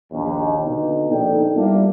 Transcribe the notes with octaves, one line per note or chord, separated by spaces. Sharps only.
A#1 D#2
B2 D3 B3 D#4
A#1 A#3 D#4 A4 D5 G5
G3 A#3 B3 D4 E4 F4